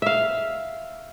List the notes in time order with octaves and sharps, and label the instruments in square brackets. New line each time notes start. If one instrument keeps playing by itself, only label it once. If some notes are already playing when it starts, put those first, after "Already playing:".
[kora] E5 F5